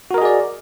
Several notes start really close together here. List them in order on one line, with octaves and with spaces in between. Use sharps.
F#4 A#4 D#5 G#4 D5